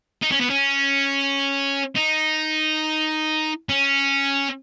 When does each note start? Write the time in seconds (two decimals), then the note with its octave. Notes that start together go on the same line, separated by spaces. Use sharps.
0.23 D#4
0.32 C#4
0.41 B3
0.50 C#4
1.96 D#4
3.69 C#4